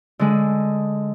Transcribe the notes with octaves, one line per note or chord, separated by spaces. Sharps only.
D3 G#3